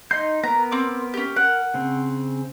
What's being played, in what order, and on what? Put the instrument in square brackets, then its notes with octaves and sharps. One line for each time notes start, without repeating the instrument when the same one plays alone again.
[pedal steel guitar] D#4 D#5 G6 [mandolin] C6
[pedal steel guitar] B3 A#4 [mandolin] A#5
[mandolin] C4 D6
C#4 G4
[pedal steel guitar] A#4 [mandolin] F#5
[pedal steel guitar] C#3 C4